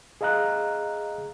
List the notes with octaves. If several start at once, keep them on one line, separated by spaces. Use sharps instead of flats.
G#4 D#5 F5 A#5 F#6